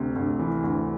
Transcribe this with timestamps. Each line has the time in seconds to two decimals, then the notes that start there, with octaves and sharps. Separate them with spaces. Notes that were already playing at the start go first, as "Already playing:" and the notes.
Already playing: D2 C3
0.16 D2
0.39 E3
0.64 D2